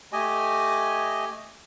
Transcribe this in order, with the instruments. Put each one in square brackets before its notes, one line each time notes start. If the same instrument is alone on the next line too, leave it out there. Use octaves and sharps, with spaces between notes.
[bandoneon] A3 G4 D#5 G#5